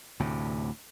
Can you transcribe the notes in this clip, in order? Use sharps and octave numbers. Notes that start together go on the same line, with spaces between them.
D2 A2 C3